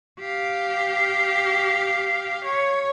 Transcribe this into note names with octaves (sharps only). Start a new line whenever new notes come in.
G4 F5
C#5